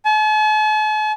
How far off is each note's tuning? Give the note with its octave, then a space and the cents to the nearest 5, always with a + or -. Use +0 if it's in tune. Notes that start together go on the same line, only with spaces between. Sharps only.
A5 -45